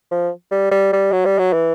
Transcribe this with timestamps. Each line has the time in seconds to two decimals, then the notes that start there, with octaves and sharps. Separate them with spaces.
0.11 F3
0.51 G3
0.71 G3
0.93 G3
1.12 F#3
1.25 G3
1.38 F#3
1.53 E3